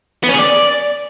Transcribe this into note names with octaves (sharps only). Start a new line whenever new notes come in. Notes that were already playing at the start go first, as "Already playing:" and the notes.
B3
C#4
G#4
D5